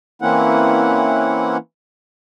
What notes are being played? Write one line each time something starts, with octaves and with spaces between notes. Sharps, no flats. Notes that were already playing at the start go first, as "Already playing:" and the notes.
E3 A#3 C4 C#4 E4 F#5